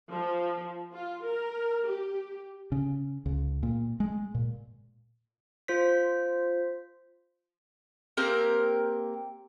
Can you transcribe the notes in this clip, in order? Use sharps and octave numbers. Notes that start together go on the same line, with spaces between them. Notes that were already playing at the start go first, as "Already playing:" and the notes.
F3
F4
A#4
G4
C#3
C#2
A#2
G#3
A#2
F4 C5 B6
A#3 C4 G4 A#4